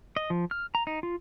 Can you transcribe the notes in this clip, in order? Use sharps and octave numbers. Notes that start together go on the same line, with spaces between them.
D#5
F3
F6
A#5
D#4
F4